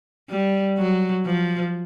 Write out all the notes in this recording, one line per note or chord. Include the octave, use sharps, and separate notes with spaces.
G3
F#3
F3